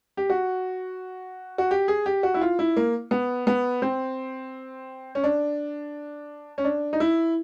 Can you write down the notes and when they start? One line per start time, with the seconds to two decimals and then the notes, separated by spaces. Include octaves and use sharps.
0.17 G4
0.30 F#4
1.58 F#4
1.71 G4
1.88 G#4
2.06 G4
2.23 F#4
2.34 E4
2.41 F4
2.59 E4
2.76 A#3
3.11 B3
3.47 B3
3.82 C4
5.15 C#4
5.24 D4
6.58 C#4
6.64 D4
6.93 D#4
7.00 E4